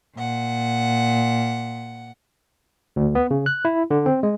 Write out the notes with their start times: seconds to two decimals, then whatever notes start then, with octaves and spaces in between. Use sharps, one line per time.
0.16 A#2 F#5
2.96 D2
3.15 B3
3.31 C#3
3.46 F#6
3.65 E4
3.91 D3
4.06 C4
4.23 G#3